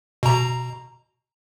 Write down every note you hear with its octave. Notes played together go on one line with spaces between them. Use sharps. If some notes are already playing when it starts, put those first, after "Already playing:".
B2 A#5